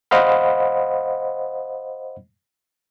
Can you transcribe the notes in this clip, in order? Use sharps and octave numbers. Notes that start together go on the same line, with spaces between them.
C5 D#5 F5 F#5 B5